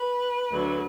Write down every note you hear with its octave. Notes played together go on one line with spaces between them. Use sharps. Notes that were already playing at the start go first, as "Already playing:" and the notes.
Already playing: B4
D2 D3 F#3